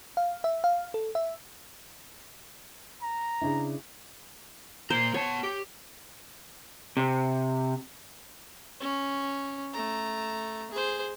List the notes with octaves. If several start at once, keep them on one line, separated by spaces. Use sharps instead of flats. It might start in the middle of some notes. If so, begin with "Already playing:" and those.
F5
E5
F5
A4
E5
A#5
C#3 D4 E4
A#2 A#3 C5 A#5
B3 C#5 A5
G4
C3
C#4
A3 A#5
G#4 C5